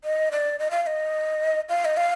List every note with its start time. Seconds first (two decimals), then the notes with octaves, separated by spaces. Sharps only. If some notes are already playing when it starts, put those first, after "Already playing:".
0.04 D#5
0.32 D5
0.59 D#5
0.71 F5
0.82 F5
0.87 D#5
1.69 F5
1.85 D#5
1.97 F5